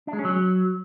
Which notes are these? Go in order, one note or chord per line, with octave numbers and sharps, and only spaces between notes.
D4
G#3
C#4
F#3